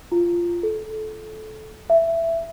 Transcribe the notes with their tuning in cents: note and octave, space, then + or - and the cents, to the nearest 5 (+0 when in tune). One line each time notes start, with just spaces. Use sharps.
F4 -10
A4 -20
E5 +10